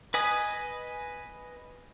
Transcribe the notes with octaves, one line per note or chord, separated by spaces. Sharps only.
B4 D#5 G#5 D#6